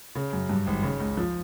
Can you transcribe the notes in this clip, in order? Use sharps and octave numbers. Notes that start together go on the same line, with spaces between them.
C#3
F#2
G2
G#1
C#3
C#2
F3